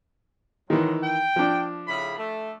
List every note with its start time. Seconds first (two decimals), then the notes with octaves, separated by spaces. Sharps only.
0.70 D#3 E3 F#3 G#3
1.02 G5
1.36 F3 D4
1.87 A2 C#3 B5
2.17 A3